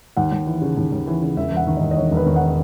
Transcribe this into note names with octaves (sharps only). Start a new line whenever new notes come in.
D#2 F#5
D#2
E3
C#3
D#2
D#2
E3
C#3
E1 E5
E1 F#5
D#3
D#2 D#5
D#5
E1 C#5
E1
B4
D#3
F#5